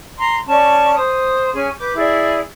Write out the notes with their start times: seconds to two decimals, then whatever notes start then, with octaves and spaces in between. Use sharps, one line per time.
0.18 A#5 C6
0.47 C#4 D5 A5 C#6
0.96 C5 D#6
1.53 C#4 G#4 G#5
1.78 B4 D6 G6
1.96 E4 G#4 D5